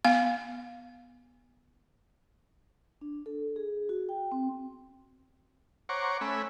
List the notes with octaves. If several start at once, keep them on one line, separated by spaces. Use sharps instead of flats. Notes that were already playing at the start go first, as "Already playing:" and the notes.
B3 F5
D4
A4
G#4
F#4
G5
C4
C5 C#5 F#5 A#5 C#6 D6
A3 C#4 G#5 B5 E6